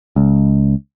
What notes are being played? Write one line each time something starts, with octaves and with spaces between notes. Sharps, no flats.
C#2